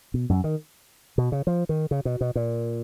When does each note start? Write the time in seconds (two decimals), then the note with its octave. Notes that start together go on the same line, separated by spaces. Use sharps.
0.14 B2
0.29 F#2
0.44 D#3
1.18 B2
1.32 C#3
1.47 F3
1.69 D#3
1.91 C#3
2.05 B2
2.21 B2
2.35 A#2